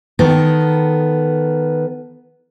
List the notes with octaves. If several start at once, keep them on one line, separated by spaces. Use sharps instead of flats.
D#3 B3 A4